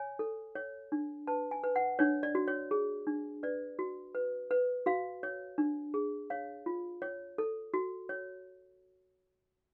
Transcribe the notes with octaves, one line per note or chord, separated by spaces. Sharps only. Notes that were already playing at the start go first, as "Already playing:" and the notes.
Already playing: C#5 G#5
A4
C#5
D4
B4 A5
G#5
B4
F#5
D4 C#5
D5
F#4
C#5
G#4
D4
B4 D5
F#4
B4
B4
F#4 F5
C#5
D4
G#4
C#5 F5
F4
C#5
A4
F#4
C#5